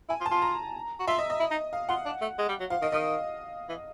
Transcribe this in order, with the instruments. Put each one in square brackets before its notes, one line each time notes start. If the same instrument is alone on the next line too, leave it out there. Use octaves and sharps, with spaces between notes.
[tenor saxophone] E4 [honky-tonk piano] G#5
[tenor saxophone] F4
[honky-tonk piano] A5
[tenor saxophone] F4
[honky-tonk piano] A#5
[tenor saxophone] F#4
[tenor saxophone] F4 [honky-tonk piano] E5
[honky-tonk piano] D#5
D#5
[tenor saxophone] E4
D#4
[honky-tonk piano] F5
[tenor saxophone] F4 [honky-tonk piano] F#5
[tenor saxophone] D4
A3
G#3
G3
F#3
[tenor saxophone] F3 [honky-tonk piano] F5
[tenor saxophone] D#3 [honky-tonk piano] D#5
[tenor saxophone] D#3 [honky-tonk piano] D#5
[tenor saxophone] E3